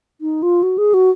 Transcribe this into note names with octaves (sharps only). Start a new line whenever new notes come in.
D#4
F4
F#4
G#4
F#4